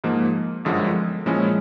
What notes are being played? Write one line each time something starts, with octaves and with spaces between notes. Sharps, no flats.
G#2 F3 A#3
G1 F#2 D3 F3 G#3
A#2 F3 G#3 C#4 E4